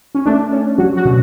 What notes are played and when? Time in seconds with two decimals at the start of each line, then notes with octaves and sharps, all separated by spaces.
0.15 C#4
0.26 A3 D4
0.53 C#4
0.78 F#3 F#4
0.97 F#4
1.05 B2